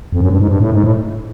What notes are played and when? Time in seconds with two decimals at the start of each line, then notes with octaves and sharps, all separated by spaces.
0.12 F2
0.21 F#2
0.30 G2
0.40 G#2
0.48 G2
0.60 A2
0.72 G#2
0.84 A2